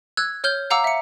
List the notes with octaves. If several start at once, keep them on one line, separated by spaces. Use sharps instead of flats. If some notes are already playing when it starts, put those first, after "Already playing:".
E6 F#6 G#6
C#5 F6 G6 G7
F5 F#5 A#5 D6 E6
E5 C#7